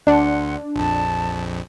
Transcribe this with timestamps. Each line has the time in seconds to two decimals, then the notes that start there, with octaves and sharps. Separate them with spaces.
0.07 D2 D4 F#5 C6 F#6
0.76 A#1 F2 A5